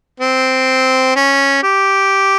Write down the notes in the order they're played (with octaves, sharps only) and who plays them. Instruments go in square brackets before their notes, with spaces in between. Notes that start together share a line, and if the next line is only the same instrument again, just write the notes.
[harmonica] C4
C#4
G4